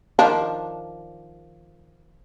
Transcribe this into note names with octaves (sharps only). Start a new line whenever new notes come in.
D#3 F3 D4